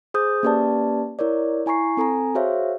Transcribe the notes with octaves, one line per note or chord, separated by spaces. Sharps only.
G#4 C5 D#6 G6
A#3 C#4 G4 B4 D5 A5
E4 A#4 C#5 D5
E4 G#5 A#5 C#6 C7
C4 A4 G#5 A#5
F#4 G#4 C5 C#5 E5 F5